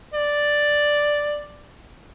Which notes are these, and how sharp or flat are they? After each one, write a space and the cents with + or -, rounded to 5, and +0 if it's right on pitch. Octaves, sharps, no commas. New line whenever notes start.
D5 +5